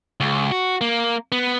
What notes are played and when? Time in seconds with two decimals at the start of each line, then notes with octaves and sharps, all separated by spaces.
0.20 C#2
0.52 F#4
0.81 A#3
1.32 B3